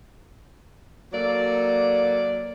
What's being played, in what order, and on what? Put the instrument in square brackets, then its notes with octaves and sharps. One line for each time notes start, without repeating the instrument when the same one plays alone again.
[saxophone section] F#3 A#3 A4 D5